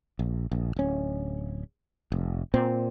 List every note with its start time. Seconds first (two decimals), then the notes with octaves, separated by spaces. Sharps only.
0.19 A#1
0.52 A#1
0.76 D1 C#4
2.12 F1
2.54 A#2 C4